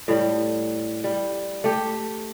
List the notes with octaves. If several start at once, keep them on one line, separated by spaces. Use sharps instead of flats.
A2 G3
G3
A3 G4